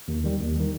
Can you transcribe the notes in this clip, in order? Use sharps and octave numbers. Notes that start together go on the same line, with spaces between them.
D#2
D#3 G3
D#2
D#3 G3